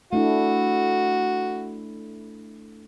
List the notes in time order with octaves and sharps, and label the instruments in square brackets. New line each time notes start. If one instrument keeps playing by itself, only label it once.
[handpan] A3 D4 E4 [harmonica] F#4